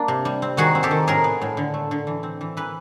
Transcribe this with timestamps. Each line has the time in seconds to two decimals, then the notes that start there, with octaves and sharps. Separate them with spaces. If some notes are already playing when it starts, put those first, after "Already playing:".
Already playing: A#3 D4
0.08 C3
0.25 G3
0.42 C4
0.57 D#3 F#4 G#4
0.75 C4
0.83 G4 A4
0.91 D#3
1.07 A2 G#4 A#4
1.24 B3
1.42 A2
1.57 D3
1.74 A3
1.91 D3
2.07 E3
2.23 C4
2.41 E3
2.57 E3 B4